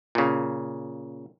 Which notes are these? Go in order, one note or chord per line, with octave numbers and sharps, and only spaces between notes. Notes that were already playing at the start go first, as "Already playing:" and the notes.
A#2 C#3